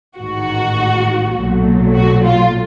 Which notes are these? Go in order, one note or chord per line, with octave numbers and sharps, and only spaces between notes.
A1 G#2 D#3 F#4
B1 A#2 F#3 A3
F#4
F4